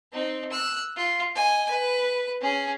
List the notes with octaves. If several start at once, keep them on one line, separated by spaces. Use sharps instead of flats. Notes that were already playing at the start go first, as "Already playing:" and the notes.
C4 D#4
E6 F#6
F4
D#5 G#5
B4
C#4 G#4